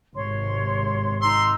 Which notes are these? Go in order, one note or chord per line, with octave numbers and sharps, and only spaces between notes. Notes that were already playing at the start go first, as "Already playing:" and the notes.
G#1 C3 C#5 C6
D#4 A#5 C6 E6